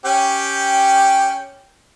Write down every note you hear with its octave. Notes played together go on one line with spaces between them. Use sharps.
C#4 G4 G5